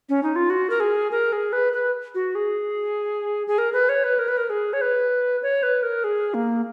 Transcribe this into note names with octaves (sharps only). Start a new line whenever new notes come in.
C#4
D#4
F4
F#4
A#4
G#4
A#4
G#4
B4
B4
F#4
G#4
G#4
A#4
B4
C#5
B4
A#4
B4
A#4
G#4
C#5
B4
C#5
B4
A#4
G#4
A#3